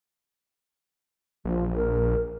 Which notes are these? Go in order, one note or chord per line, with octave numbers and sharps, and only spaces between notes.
A#1 F3
A#4